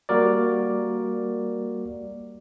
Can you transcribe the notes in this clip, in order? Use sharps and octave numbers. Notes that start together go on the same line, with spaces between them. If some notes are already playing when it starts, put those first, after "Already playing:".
G3 A#3 F#4 A#4 D5